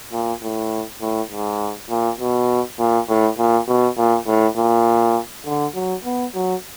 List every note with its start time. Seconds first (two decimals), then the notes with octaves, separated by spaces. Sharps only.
0.12 A#2
0.42 A2
1.01 A2
1.31 G#2
1.90 A#2
2.20 B2
2.79 A#2
3.08 A2
3.39 A#2
3.68 B2
3.98 A#2
4.27 A2
4.56 A#2
5.46 D3
5.75 F#3
6.05 B3
6.34 F#3